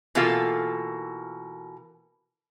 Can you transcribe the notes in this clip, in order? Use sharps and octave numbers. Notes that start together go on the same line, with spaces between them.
B2 E3 A#3 F4 A4